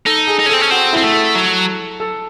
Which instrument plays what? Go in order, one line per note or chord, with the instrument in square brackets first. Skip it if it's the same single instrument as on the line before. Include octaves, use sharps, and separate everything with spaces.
[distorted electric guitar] D#4 [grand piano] A4
[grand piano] G#4
[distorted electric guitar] D#4
C#4
[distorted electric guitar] C4 [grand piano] A4
[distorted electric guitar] C#4
[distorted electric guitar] C4 [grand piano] F#4
[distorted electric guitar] C4 [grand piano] E4
[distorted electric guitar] A3
[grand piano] A4
[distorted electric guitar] F#3
[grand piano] A4